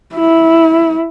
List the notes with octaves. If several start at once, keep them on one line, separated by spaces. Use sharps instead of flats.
E4